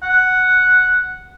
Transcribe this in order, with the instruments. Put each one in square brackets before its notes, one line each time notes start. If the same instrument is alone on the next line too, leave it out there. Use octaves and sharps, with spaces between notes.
[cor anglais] F#5